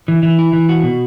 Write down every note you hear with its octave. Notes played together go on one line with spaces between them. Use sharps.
E3
E3
E4
E3
F#4
B2